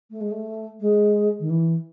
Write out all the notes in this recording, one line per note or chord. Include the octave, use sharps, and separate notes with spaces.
A3
G#3
A3
G#3
D#3
E3